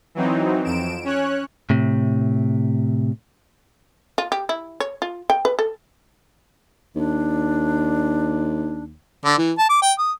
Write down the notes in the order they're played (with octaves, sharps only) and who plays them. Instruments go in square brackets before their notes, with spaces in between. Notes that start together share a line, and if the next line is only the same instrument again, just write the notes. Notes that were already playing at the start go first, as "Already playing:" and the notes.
[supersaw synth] E3 F#3 C4 D#4
F2 D7 E7
C#4 C#5 F#6
[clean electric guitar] A2 C3
[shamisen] F4
G4
E4
C#5
F4
G5
B4
A4
[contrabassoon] D#2 [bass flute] D4
[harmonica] D3
E3
A5
D6
G5
D#6